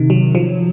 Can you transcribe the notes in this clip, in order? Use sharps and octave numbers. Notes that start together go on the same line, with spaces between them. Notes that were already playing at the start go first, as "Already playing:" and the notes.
Already playing: C3 D#3
F#3
F3